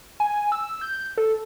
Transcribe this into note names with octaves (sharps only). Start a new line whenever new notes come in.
G#5
E6
G6
A4